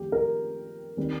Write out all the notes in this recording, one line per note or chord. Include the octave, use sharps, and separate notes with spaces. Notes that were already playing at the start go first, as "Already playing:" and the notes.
Already playing: F2 D#3 A3 G4
A#4
D#3 G3 C4